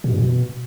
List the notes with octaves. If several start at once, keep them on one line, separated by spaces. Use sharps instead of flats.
B2
G2
B2